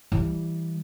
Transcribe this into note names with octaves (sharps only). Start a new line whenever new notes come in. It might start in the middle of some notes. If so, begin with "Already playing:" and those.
E3 G3